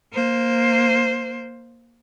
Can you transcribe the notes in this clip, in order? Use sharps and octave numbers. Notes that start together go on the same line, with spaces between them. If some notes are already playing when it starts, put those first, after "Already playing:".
A#3 C5